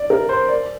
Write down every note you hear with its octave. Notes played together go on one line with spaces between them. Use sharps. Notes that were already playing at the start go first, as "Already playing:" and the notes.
Already playing: D5
A#4
C5
D5